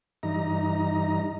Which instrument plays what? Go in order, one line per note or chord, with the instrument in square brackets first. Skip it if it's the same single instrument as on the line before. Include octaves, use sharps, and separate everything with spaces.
[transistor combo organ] G2 E3 D#4 A#5